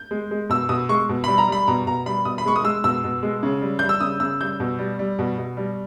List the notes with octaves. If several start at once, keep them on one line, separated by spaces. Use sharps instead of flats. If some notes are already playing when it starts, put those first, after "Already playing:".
Already playing: G6
G#3
G#3
B2 E6
B2 D#6
G#3 C#6
B2
G3 B5
A#5
G3 B5
B2 A#5
B2 A#5
G3 B5
B2 D#6
B5
G#3 C#6
D#6
G#3 E6
B2 E6
B2
G#3
C#3
G3
G3 G6
E6
C#3 D#6
C#3 E6
G3 G6
B2
G3
G3
B2
B2
G3